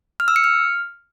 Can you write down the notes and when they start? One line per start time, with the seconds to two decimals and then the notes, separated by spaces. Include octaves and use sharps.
0.20 F6
0.28 E6
0.36 C#7
0.44 F6